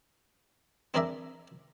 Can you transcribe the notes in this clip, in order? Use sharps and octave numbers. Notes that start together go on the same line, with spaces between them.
C4 D4 G#4 A#4 D5 E5